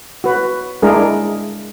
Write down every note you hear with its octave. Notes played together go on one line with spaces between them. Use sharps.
F#4 B4
G#3 D4 E4 G#4 A#4